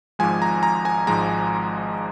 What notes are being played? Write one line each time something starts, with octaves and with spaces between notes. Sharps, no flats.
G#1 G#2 F3 G#3 G#5
A#5
A#5
G#5
G#1 G#2 F3 G#3 A#5